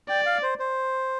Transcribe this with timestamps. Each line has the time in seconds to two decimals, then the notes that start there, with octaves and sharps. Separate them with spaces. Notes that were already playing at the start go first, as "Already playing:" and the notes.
0.09 D5 G5
0.26 F5
0.43 C5
0.59 C5